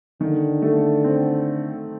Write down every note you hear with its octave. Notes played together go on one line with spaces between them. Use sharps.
D3 D#3
A3
C4